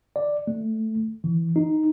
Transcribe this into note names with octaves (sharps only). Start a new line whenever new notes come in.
D5
A3
E3
D#4